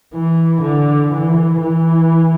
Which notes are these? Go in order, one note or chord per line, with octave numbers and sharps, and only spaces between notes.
E3
D3
E3
E3